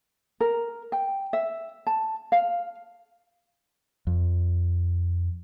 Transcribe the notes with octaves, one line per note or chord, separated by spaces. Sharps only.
A#4
G5
E5
A5
F5
F2